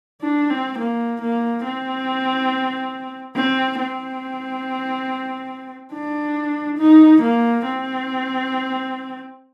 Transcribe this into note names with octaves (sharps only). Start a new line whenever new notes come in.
D4
C4
A#3
A#3
C4
C4
C4
D4
D#4
A#3
C4